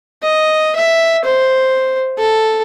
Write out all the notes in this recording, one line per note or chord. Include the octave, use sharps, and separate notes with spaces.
D#5
E5
C5
A4